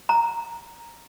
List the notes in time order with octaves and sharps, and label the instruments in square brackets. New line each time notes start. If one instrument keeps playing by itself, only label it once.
[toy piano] A#5